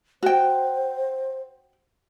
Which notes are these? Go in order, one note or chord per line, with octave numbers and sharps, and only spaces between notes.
F#4 C5 G5